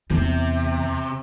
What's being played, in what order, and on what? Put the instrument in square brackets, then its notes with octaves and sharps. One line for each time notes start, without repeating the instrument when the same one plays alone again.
[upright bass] E2 [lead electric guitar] C3